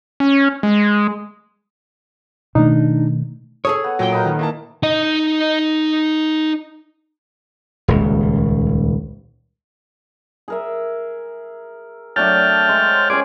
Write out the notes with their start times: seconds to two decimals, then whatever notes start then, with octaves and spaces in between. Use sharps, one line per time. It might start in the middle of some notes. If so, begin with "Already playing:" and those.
0.20 C#4
0.63 G#3
2.55 B2 D#3 A3 D4 D#4
3.65 G#4 A4 C#5 D#6
3.84 B3
3.99 A#2 F#3 G5
4.12 A#4 B4 D#5
4.25 D#3
4.39 A#3 E4 A5
4.83 D#4 D#5
7.88 D#1 C#2
10.48 G#4 A#4 E5
12.16 F#3 A3 D4 G5 A5 F6
12.68 G#3 C5 C#5
13.10 C#4 G4 G#4 C5 D5